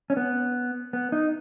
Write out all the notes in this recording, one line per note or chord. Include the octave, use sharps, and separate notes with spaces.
C#4
B3
B3
D#4